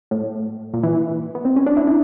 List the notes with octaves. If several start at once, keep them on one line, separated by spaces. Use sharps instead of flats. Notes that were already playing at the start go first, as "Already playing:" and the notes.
A2
A#2
E3
B3
C4
C#4
D4
E4
D4